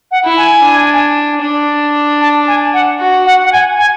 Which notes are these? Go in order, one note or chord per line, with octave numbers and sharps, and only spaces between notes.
F#5
E4
G#5
D4
D4
A5
G#5
F#5
F#4
F#5
F#5
G#5
G#5